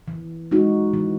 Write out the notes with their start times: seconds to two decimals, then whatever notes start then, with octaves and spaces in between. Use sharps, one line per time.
0.08 E3
0.51 G#3 D#4 F#4
0.94 E3